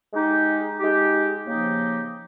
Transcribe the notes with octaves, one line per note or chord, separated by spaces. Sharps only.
G#3 D#4 G4
G#3 D#4 G4
C#3 F3 A#3 D#4 G4